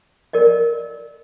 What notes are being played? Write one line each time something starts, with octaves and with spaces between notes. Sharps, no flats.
A#4 D5 D#5